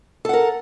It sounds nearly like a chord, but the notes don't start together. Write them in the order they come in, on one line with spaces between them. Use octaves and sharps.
A4 F#5 A#4